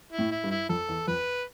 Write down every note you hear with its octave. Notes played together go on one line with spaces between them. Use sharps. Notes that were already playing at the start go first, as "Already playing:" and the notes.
E4
A2
E4
G2
E4
F2 A4
E2
F2 B4